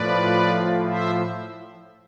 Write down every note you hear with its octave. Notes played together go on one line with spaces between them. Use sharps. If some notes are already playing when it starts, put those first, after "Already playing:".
Already playing: A2 F3 B4 D5
C5 E5